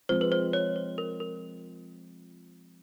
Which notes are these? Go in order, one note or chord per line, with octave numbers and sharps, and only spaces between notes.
F3 G#3 C4 F4 C5
B4
C5
C#5
C5
A#4
A#4